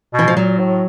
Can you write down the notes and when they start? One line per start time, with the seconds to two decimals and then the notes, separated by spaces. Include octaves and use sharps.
0.14 B2 E3
0.28 F3
0.36 A#2 F#3
0.59 A2